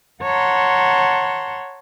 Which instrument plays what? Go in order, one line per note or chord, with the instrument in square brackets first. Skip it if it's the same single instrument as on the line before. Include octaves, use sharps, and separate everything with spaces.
[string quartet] C#5 F#5 A5 A#5 C6